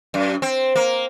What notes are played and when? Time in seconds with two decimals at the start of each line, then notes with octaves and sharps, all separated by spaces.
0.14 F#2
0.42 C4
0.76 A#3